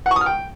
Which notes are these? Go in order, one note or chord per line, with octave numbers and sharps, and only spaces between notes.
F#5
C#6
D#6
F6
G5